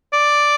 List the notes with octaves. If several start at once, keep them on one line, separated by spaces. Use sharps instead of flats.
D5